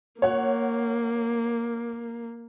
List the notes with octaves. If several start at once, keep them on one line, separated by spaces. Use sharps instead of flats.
A#3 C#5 F#5